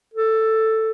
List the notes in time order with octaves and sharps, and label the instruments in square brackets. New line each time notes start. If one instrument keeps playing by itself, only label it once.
[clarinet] A4